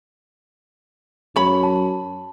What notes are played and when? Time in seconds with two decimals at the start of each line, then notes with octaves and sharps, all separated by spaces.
1.36 F#2 C#5 B5
1.63 A5